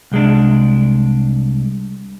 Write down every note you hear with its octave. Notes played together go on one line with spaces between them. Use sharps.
C2 G#3 D4